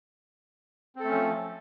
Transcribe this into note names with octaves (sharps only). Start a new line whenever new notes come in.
F3 A3 C4 C#4 A4